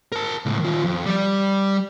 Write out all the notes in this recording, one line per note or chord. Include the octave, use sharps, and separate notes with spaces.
A#4 A5
C#2 A2
D#3 F4
F2
G3 D5